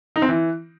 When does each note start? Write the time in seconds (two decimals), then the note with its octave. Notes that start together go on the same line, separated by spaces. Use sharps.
0.16 D#4
0.22 C4
0.28 E3